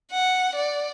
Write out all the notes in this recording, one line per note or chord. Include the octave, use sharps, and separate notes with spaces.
F#5
D5